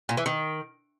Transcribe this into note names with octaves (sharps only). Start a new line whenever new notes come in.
A#2
E3
D#3